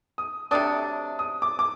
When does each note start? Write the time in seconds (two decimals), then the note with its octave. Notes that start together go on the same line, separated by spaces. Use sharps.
0.18 D#6
0.51 C3 F#3 A3 D4 D#6
1.19 D#6
1.42 D6
1.59 D6